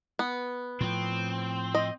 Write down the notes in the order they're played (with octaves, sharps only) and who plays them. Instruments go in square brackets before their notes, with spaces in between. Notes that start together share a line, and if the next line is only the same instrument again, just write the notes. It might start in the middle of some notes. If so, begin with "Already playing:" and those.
[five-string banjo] B3
[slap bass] A2 F3 [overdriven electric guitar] C4
[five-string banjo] D#5